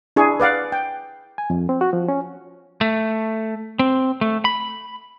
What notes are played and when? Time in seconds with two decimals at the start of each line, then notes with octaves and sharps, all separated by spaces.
0.16 D4 E4 G#4 C#6
0.40 B4 D5 F5 F#5
0.72 G5
1.38 G#5
1.50 F2
1.69 C4
1.81 F#4
1.93 F3
2.08 C#4
2.81 A3
3.79 C4
4.21 A3
4.45 B5